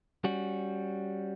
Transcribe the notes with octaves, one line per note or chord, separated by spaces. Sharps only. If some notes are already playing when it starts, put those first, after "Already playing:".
G3 C#4 F#4